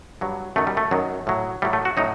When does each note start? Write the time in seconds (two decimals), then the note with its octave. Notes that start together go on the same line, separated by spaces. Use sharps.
0.21 G2 F#3
0.56 F#2 D#3 F#3 A3
0.67 G3
0.77 A3
0.91 F#2 D#3 F#3
1.27 A2 F#3
1.62 A2 F#3 G3
1.73 A3
1.85 F#4
1.97 A2 F#3 D#4